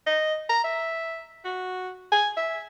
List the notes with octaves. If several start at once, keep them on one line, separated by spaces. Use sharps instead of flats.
D#5
A#5
E5
F#4
G#5
E5